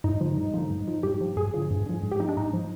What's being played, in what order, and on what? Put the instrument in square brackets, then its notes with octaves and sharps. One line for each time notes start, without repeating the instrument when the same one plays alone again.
[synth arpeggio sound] G2 D#4
D3 F3
G2
D3 F3
G2
F3
G2 G4
F3
G2 G#4
D3 F3
G2
D3 F3
G#2
G4
F3 D#4
D4
G#2 D#4
F3